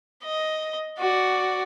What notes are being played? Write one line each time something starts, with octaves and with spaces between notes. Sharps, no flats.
D#5
F#4 D5